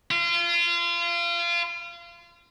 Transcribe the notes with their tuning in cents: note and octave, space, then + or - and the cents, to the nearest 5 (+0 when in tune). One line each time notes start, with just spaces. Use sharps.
F4 -30